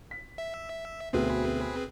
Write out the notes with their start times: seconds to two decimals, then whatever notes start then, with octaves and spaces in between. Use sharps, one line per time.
0.11 B6
0.38 E5
1.13 D2 B2 C4 G#4 B4